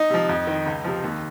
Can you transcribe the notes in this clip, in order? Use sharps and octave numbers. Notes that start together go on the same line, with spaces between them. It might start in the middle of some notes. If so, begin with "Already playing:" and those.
Already playing: D#4
C3 F3
F2
D#3
C#2
C3 F3
D#2